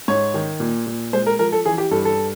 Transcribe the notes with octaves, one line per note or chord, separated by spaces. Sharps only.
G#2 C#5
D#3
A#2
A#2
G#3 C5
A#4
F3 A#4
A4
E3 G#4
G4
G2 A4
A4